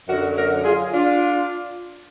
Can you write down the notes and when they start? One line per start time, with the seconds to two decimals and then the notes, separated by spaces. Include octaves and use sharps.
0.07 F#2 D3 F#3 F#4 A#4
0.35 F#4 A#4
0.64 F4 G#4
0.92 D4 F4